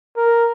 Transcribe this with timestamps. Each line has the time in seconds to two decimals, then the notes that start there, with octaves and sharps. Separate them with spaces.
0.17 A#4